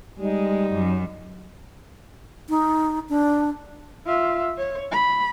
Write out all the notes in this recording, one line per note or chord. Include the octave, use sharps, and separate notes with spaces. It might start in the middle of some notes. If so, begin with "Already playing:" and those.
G3 G#3 D#4
F#2
D#4
D4
F4 E5
C#5
B5